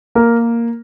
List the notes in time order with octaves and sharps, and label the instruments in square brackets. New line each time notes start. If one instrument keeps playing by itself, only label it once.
[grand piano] A#3 A#4